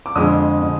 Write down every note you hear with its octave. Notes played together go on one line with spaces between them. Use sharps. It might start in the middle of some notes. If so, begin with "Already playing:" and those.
D6
F2 D3 G#3 D#6
D3